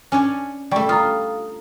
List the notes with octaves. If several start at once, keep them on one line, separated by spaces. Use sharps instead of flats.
C#4 D4 C#5 G#5
G3 A3 D5 G5 C#6
F4 A#5 D#6